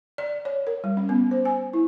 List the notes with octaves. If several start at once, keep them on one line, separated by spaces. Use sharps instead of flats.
D5
C#5
A#4
G3
C#4
B3
C5
G#5
E4